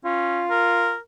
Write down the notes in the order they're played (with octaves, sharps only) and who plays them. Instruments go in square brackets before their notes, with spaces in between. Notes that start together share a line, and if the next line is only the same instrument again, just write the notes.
[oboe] C#4 [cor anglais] F4
[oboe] A#4